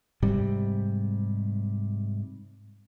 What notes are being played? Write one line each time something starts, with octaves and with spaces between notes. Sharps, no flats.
G#2 C3 G3